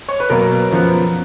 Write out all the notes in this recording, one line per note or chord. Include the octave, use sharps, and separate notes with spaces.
C#5
B4
B2 F#3 A#3 A#4
F#2 F3 B3